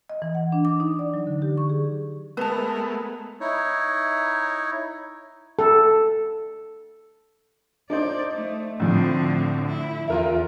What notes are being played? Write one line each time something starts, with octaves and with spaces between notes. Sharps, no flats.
D#5
E3
F#5
D4
D6
D#4
D5
F#3
D3
G4
C#6
G#4
G#3 A3 B3 A#4 B4 A5
D#4 E4 C#5
A4
D4 D#4 C5 D5
A3
A2 D3 F3 C4
E4
E2 F4 A#4 E5